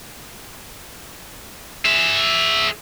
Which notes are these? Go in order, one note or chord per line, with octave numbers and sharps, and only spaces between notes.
G#4 E5